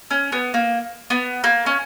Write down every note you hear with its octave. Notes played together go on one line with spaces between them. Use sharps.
C#4
B3
A#3
B3
A#3
C#4